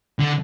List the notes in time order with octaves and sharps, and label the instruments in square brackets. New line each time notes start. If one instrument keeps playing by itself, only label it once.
[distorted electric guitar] D3